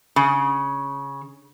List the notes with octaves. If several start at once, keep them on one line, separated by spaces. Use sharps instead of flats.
C#3